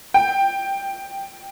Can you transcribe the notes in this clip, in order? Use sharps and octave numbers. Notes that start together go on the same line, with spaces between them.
G5